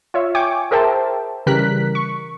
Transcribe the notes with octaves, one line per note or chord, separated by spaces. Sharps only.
F4 C#5 E5
G5 G#5 C#6 D6
G#4 A#4 C5 E5 G5 A5
C#3 E3 G3 A#4 F#6 B6
C#6